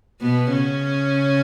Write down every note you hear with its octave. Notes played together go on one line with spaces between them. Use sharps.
B2 B3
C#3 C#4